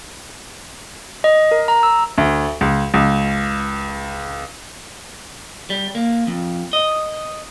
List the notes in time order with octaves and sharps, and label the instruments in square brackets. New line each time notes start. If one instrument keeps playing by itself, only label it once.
[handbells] D#5
A#4
A#5
E6
[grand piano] D2
C#2
C#2
[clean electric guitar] G3
A#3
F2
D#5